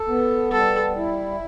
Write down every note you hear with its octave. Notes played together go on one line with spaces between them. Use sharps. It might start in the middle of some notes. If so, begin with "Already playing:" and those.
Already playing: A4
B3
G3 A4
E4